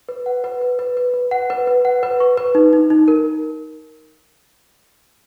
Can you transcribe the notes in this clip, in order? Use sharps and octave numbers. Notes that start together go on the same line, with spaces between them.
B4
F#5
B4
B4
B4
B4
B4
F#5
B4
B4
F#5
B4
C#6
B4
D#4
D#4
D#4
A#4